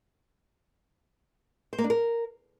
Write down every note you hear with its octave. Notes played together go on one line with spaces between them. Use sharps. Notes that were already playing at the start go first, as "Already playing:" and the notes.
C5
A#3
D4
A#4